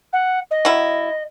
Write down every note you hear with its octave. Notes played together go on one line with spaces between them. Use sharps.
F#5
D#5
F#3 E4